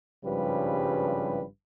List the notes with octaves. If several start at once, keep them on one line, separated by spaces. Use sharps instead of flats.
G#1 G2 C#3 F3 G3 B4